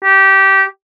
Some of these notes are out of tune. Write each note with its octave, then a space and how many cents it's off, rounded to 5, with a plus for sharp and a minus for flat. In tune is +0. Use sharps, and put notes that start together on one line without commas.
G4 -20